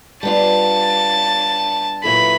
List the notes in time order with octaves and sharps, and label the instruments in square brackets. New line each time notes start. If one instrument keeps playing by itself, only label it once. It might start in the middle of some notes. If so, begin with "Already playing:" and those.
[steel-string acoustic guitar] G3 B3 D4 F4 [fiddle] A5
[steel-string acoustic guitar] A#2 F#3 B3 E4 A4 [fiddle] B5